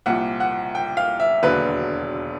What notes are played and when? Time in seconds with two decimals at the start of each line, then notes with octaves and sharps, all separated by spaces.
0.06 C2 A#2 F3 F#5
0.40 F#5
0.75 G5
0.97 F5
1.20 E5
1.43 E1 D#2 D3 F#3 B4